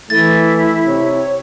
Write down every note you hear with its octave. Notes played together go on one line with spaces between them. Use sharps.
E3 A3 E4 A6
C3 C#5